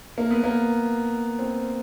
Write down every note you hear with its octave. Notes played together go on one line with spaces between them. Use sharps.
A#3
B3
A#3
C4